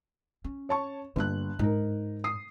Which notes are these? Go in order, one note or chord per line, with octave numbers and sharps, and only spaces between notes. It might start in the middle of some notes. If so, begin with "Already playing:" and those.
C#4
C#5 A5 C#6
G1 G2 A#3 F#6
G#2 D#4 A#4
D#6 C7